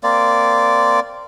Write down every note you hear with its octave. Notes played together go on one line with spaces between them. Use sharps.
A#3 C4 D5